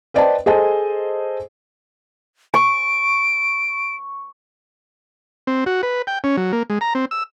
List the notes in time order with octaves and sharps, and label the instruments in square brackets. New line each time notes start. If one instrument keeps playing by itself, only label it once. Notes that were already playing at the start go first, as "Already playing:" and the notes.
[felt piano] B4 C5 D5 D#5 G5 A5
G#4 A4 C5 D#5 G#5 A5
[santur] C#6 [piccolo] D7
[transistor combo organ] C4
F#4
B4
G5
C#4
F#3
A#3
G#3
A#5
C4
E6